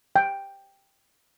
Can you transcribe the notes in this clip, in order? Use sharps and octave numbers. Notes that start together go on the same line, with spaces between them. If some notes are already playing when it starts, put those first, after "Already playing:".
G5